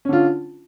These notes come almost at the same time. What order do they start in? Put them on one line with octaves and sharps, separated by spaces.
C#4 D3 F4